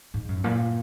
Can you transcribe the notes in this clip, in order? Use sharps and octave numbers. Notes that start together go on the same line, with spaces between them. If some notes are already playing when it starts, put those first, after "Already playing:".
G#2
F#2
A#2